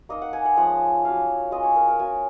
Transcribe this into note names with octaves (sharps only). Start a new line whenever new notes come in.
A#3 D#4 D#5
F#5
G#5
F#5
F3 G#3 C#4 F#5
F#3 C#4 F4 F5
G#3 C#4 F4 D#5
C#5
A#4
A#4
F#3 C#4 F4 G#5